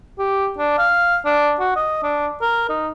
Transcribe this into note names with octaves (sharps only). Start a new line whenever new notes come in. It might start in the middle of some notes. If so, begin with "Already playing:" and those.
G4
D4
F5
D4
F#4
D#5
D4
A#4
D#4